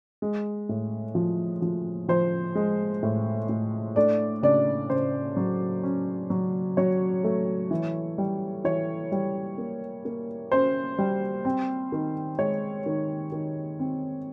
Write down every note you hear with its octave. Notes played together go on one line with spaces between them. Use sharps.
G#3
A2
F3
F3
F3 C5
G#3
A2
A2
A3 D4 D5
C#3 D4 D5
C#3 C5
F#3
C#4
F#3
F#3 C#5
A3
E3
G3
E3 C#5
G3
A#3
A#3
C#4 C5
G3
C4
D#3
G#3 C#5
D#3
D#3
C4